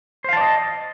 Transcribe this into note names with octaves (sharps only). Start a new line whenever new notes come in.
C5 D5 D#5 F5 A5